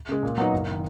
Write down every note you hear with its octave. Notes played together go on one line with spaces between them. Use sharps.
C#3 G#3
A#2
F#3 B3 D#4
F#1
D#3